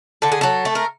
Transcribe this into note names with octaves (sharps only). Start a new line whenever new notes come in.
D3 A4
G#4
F#3 A4
A3
A#4